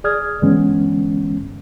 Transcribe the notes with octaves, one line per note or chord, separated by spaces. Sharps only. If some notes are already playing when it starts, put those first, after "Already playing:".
G#4 D5 D#6 F6 G#6
G2 D3 E3 G#3 B3 C#4